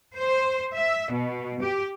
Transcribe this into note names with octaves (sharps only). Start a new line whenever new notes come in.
C5
E5
B2
G4